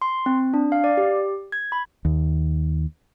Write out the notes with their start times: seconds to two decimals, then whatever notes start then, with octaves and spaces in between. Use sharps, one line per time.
0.02 C6
0.26 C4
0.54 D4
0.72 F5
0.84 D5
0.97 G4
1.52 G#6
1.72 B5
2.05 D#2